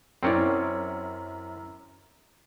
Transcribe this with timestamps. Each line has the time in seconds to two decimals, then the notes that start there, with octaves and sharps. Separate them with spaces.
0.23 F#2 C4 C#4 E4 D5